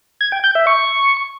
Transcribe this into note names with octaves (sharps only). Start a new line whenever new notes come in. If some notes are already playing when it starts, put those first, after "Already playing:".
G#6
G5
G6
E5
C#6